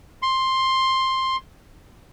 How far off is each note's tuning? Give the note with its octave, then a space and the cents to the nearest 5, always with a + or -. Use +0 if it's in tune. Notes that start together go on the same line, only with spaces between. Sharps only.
C6 +10